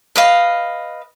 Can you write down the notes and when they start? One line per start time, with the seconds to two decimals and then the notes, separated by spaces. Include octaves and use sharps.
0.16 B4 D#5 F5